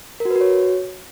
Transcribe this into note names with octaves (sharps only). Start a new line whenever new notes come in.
A#4
F#4
B4
F#4
C#5